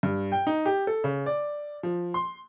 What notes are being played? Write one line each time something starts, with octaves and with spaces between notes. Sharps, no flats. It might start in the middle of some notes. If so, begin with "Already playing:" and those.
G2
G5
D#4
G4
A4
C#3
D5
F3
C6